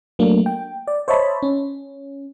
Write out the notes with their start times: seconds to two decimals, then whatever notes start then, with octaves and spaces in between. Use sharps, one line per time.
0.19 F#3 A3 A#3 D4
0.46 G5
0.88 D5
1.08 C5 C#5 D#5 E5 A5 B5
1.43 C#4